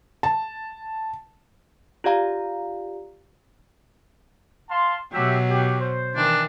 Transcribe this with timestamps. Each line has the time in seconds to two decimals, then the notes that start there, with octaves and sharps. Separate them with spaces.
0.23 A5
2.04 F4 G4 D5 F5 A#5
4.70 F5 A5 C6
5.12 B2 F#3 G4 E5
5.49 G4
5.80 C5
6.15 D#3 E3 D4